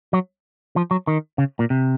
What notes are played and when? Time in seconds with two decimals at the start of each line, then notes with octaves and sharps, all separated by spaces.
0.13 F#3
0.76 F3
0.91 F#3
1.07 D#3
1.38 C#3
1.59 A#2
1.70 C3